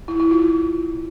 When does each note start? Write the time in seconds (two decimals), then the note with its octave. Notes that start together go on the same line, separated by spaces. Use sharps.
0.08 E4
0.20 E4
0.31 F4